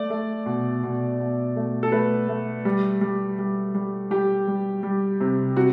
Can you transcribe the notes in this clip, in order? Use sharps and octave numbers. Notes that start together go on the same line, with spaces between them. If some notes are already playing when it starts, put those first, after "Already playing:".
Already playing: A3 D5
A3
B2
B2
B2
A3
A4
A3 B4
A3
G3
G3
G3
G3
G3 G4
G3
G3
C3
C3 F#4